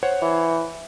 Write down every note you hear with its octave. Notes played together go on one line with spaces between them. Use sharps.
C5 C#5 F#5
E3